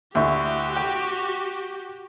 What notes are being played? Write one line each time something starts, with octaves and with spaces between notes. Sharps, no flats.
D2 E4 F#4 G4 C#6
G5